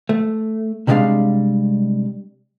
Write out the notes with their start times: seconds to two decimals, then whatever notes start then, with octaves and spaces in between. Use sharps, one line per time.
0.09 A3
0.87 C3 G3 G#3 C4 D4 F5